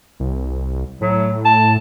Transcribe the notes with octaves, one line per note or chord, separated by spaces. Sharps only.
C2
A2 F#3
A5